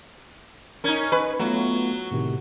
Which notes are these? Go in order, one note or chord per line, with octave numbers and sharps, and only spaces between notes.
C#4 D#4 A#4 G#6
B4 D#5 G#5 C#6
F#3 A3 B3 F4
A2 C3 D#3